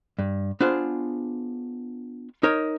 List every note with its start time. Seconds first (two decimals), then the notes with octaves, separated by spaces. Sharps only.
0.19 G2
0.60 B3 D4 F4 G#4 C5
2.43 D#4 A#4 C#5